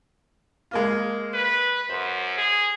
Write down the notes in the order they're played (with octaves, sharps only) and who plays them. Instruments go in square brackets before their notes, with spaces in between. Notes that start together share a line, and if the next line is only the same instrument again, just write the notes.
[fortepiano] G#3 A#3 F4
[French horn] B4
[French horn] F#2 [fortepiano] C5
[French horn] G#4